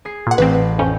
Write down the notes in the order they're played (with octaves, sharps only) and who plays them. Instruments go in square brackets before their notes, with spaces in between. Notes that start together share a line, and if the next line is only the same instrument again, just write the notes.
[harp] G#4 C7
[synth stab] A#2 F#5
[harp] A1 C7 [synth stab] C4 B4
[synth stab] F2 C#4 [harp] G5